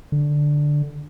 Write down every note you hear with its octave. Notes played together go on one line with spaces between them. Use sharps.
D3